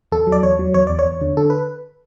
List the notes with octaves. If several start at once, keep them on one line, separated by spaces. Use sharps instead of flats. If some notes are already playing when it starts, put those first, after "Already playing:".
E2 A4
F#3
D5
E2 C#5
F#3
E2 C#5
E2 D5
C#5
E2
D3
D3 A4
B4